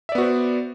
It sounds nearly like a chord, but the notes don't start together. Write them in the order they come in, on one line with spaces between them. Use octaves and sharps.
E5 D5 B3 F#4 C5